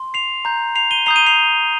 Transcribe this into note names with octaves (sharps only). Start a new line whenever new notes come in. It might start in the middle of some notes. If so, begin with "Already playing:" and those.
Already playing: C6
C7 F7
A#5 G6
C7 F7
D#7 G7
A#5 D#6 G6 C7 F7
D#7 G7
C7 F7